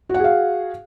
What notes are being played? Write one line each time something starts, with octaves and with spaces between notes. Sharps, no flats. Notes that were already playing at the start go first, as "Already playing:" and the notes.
F#4 G#4 F5 F#5